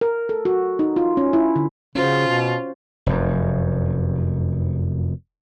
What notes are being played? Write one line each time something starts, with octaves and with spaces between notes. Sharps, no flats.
A#4
A4
F#4
D#4
F4
C#4
E4
D3
C#3 C#4 F4 F#4 C5
B2
F1 F#2